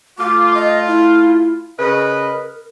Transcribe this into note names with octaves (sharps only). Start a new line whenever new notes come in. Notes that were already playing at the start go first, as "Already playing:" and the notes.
A3 F4 D6
D#5
E4
C#3 A#4 B4 D#5